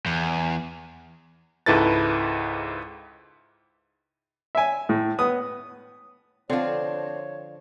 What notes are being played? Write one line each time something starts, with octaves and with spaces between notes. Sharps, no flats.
E2
C#2 G#2 E4 A4 B4 A6
E5 G#5
A2
B3 D#6
D3 F3 C4 D4 C#5 D5 F5